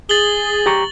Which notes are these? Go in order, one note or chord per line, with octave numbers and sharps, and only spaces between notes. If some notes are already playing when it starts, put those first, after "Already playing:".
G#4 A6 F#7 G7
G4 A#5 C#6